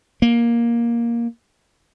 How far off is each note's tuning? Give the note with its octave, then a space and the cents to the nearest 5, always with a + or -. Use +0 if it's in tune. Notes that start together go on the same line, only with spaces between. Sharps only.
A#3 +10